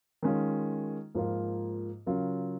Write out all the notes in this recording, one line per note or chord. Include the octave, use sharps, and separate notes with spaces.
D#3 G#3 C#4 F4
G#2 F3 A#3 F4
C#3 F#3 C#4 F4 A#4